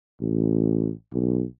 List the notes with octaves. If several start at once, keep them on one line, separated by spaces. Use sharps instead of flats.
A1
B1